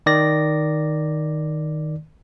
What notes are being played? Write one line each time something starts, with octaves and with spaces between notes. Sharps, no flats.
D#3 D5 A#6